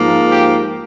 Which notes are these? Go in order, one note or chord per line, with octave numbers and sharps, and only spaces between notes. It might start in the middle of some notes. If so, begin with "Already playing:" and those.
Already playing: G#2 F3 A#3
G4